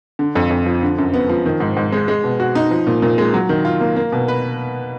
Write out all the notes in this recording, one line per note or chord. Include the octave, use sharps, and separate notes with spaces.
D3
F2
F2
F3
D3
F#2
B3
F3
D#3
G#2
G#2
G#3
G#3
B2
F#4
D#4
F3
A#2
A#2
G#3
F#3
D#3
F4
A#3
A#3
B2
B4